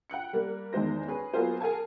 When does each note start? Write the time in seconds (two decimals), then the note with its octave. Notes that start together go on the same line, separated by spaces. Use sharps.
0.10 F#5 G5 F#6 C#7
0.33 G3 A#3
0.73 E2 D#3 G#3 C5 A#6
1.07 C#4 G#4 B4
1.34 F#3 A#3 B3 F4 G#4 C5
1.60 G#4 A#4 F#5 G#5 A5